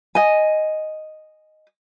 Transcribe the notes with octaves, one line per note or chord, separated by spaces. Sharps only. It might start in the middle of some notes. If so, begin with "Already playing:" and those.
D#5 G#5